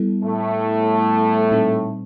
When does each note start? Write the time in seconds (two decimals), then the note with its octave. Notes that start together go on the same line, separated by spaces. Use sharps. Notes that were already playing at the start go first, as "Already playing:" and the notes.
Already playing: G3 B3 E4 A4
0.23 A2 A3
1.51 A#2 G3 C4 D#4